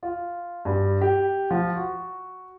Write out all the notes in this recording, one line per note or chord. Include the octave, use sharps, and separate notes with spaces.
F4
G2
G4
F3
F#4